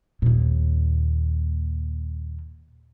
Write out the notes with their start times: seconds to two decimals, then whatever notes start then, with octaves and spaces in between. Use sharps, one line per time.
0.22 D#2 A#2